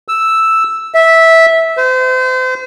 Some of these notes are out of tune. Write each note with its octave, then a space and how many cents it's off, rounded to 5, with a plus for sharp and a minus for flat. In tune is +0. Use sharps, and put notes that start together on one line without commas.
E6 +0
E5 -10
C5 -35